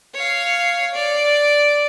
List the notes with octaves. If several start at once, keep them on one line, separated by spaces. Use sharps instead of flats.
C#5 F5
D5